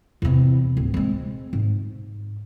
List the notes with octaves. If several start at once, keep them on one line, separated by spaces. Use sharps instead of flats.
E2 C3
D1 C2
G#3 C4
G#2